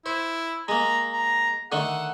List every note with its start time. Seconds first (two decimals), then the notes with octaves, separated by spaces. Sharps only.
0.06 E4 C5
0.68 G#3 A#3 A#5
1.13 A#5
1.72 D3 D#3 A3 F#5